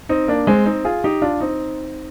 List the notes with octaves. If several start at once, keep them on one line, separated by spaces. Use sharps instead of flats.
C4 D#4
A#3 D4
G#3 C4
C4 D#4
F4 G#4
D#4 G4
D4 F4
C4 D#4